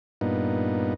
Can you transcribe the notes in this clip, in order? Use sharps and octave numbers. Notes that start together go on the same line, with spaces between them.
G2 A#2 B3 D#4